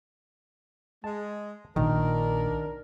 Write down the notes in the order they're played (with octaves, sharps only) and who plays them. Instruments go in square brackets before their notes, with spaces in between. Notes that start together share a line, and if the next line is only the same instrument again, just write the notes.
[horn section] G#3 [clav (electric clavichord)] A5
[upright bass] A#1 [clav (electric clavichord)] D#3 [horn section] D4 A#4